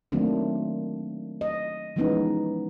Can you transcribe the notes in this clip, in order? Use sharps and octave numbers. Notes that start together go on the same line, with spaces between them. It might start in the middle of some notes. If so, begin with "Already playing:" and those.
D#3 F#3 A3 A#3 C4 D4
D#5
E3 F3 G#3 B3 C#4 D#4